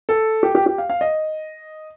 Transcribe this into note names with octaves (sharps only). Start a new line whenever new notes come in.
A4
G4
G4
G4
F5
F5
D#5